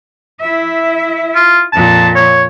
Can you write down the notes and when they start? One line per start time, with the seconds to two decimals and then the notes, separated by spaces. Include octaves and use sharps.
0.40 E4 E5
1.35 F4
1.73 F2 A#2 A5
2.15 C#5